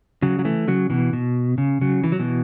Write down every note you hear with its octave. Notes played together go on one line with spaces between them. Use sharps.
C#3 F#3
F#3
E3 A3
C#3 F#3
B2 E3
B2
C#3
C#3 F#3
E3
F#3
B2 E3